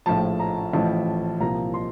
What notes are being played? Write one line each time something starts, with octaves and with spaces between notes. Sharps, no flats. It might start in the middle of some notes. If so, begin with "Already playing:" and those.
A#1 A2 F3 A5
A#5
A1 A2 F3 A5
C2 A#2 F3 A#5
C6